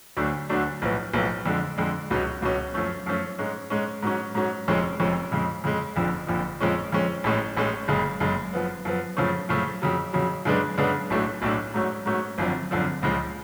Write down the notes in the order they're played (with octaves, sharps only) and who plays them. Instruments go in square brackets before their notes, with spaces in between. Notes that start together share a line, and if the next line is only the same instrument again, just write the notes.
[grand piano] D2 D3 F#3 A3 D4
D2 D3 F#3 A3 D4
B1 A2 F3 B3
B1 A2 F3 B3
F2 D3 G#3
F2 D3 G#3
C#2 B2 F#3 C#4
C#2 B2 F#3 C#4
F#2 F3 A3 C#4
F#2 F3 A3 C#4
G#2 G#3 C#4
G#2 G#3 C#4
G#2 F#3 C#4
G#2 F#3 C#4
F1 F2 F3 G#3 C#4
F1 F2 F3 G#3 C#4
F2 C#3 G#3
F2 C#3 G#3
F#1 F2 D3 F3
F#1 F2 D3 F3
F2 F3 G#3 C#4
F2 F3 G#3 C#4
A1 A2 G#3 C#4
A1 A2 G#3 C#4
F#1 F#2 C#3 G#3
F#1 F#2 C#3 G#3
F#2 F3 B3
F#2 F3 B3
F#2 C#3 F3 A3 C#4
F#2 C#3 F3 A3 C#4
F2 C#3 F#3
F2 C#3 F#3
F#2 C#3 G#3 B3 D4
F#2 C#3 G#3 B3 D4
B1 A2 F#3 A3 D4
B1 A2 F#3 A3 D4
G#2 F#3 A3 C#4
G#2 F#3 A3 C#4
G#1 F#2 D3 F3
G#1 F#2 D3 F3
C#2 C#3 F3 G#3